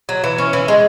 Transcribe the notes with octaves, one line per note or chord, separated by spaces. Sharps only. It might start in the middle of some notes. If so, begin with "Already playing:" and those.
F#3
E3
C#4
E3
G#3